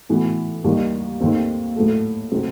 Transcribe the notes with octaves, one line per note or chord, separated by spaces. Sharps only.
A2 E3 B3 F#4
D#2 D#3 G3
D#2 D#3 A3 C4
A2 F#3 A3
C3 F#3 A3 C4